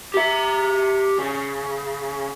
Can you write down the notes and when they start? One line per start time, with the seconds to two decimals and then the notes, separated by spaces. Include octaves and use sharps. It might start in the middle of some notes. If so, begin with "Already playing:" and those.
0.14 G4 E5
1.18 C#3